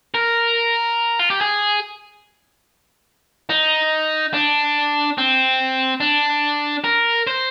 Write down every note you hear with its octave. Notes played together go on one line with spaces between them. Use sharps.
A#4
F4
G4
G#4
D#4
D4
C4
D4
A#4
C5